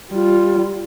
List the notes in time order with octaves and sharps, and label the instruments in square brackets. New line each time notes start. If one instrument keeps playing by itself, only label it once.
[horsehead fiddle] G3 F4